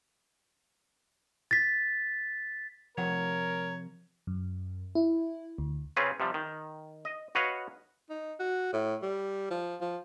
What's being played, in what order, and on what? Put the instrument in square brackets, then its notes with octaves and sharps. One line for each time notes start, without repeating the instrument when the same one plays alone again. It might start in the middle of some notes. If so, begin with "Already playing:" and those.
[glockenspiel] A6 B6
[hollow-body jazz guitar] C3 F3 F#5 [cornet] A#4 [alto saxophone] C#5
[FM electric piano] F#2
E4
D2
[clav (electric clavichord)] C#3 C4 C#4 F4 G#4 B4
C3 F3 G3
D#3
D#5
F#4 B4 C#5 D#5 F5 F#5
[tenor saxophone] D#4
F#4
A2
G3
F3
F3